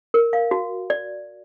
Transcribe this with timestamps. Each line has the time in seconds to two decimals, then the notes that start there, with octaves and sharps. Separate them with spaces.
0.14 A#4
0.33 F5
0.51 F#4
0.90 D5